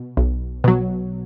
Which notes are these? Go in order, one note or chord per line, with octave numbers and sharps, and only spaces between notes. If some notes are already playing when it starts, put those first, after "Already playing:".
Already playing: B2
B1
B2 F#3